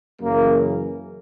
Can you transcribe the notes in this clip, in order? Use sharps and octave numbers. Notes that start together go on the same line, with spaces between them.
F#2 C#3 E3 A#3